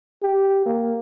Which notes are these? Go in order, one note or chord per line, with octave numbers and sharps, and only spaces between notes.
G4
A#3